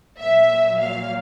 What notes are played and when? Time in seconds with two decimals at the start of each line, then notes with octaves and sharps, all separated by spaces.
0.19 A#2 F#3 E5
0.79 F5